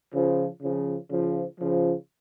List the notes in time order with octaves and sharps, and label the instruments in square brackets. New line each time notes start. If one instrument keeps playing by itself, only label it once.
[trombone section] C#3 F3
C#3 F3
C#3 F3
C#3 F3